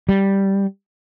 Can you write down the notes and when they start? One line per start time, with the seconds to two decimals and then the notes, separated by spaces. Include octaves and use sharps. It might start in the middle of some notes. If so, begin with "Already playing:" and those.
0.09 G3